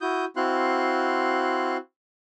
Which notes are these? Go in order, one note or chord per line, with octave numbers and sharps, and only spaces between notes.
E4 F#4 D#6 G6
C4 E4 F#4 F5 C6 F#6